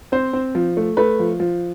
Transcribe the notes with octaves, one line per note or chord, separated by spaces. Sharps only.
C4 C5
C4
F3
A3
A3 B4
F3
F3